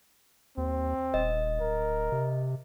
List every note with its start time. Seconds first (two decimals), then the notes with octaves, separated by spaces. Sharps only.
0.57 D#2 C4
1.14 D#1 D#5
1.60 D1 A#4
2.12 C3